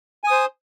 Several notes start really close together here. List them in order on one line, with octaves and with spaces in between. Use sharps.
G#5 D#6 C5